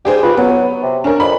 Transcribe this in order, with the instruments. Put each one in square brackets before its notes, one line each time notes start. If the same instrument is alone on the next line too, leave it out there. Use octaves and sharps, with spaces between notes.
[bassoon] G3 [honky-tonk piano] G4 G#4 C5
[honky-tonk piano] F4 G4 [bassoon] B4
[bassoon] F#3 [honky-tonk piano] B3
[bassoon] C3
[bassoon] C#4 [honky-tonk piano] D4 A#4
[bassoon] F2 [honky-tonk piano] B5